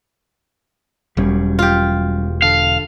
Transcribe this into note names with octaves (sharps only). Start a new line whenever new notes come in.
E1 F#3 G3 C#4
F4 G4
D3 A4 F5